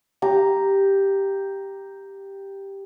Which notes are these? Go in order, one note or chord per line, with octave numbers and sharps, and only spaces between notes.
G4 A#5